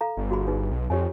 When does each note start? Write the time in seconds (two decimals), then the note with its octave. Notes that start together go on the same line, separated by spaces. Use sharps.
0.01 A4 F5 A#5
0.17 G1
0.31 F#4 G#4 B5
0.47 D#4 G#4 B4
0.72 B1
0.90 F2 G4 C#5 G#5